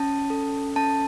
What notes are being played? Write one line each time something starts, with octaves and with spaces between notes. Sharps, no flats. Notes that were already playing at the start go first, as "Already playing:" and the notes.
Already playing: C#4 A5
A4
C#4 A5